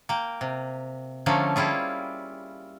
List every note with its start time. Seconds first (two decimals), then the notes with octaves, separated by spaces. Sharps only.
0.09 A#3 G5
0.41 C3
1.26 D3 F3 A3 A#3 C#4
1.56 G3 E4 F4 G#4